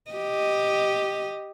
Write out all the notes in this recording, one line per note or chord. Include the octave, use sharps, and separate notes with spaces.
G4 D#5